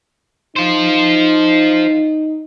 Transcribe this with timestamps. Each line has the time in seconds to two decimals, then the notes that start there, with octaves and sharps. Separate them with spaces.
0.56 D#4 F4 C5